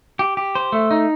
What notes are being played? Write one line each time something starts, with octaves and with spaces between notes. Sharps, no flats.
G4
G4
C5
A3
D#4